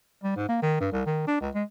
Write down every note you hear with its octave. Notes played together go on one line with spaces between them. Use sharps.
G3
G#2
A#3
D#3
G2
C2
D#3
D4
C#2
G#3